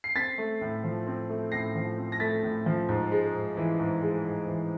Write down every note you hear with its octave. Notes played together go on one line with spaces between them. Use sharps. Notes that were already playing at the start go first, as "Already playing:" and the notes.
C7
C4 A6 B6
A3
A2
F3
C4
A3
A2 A#6 C7
F3
C4
A#6
A3 A6 B6
A2
F3
G#2
G#3
G#2
E3
G#2
G#3
G#2
E3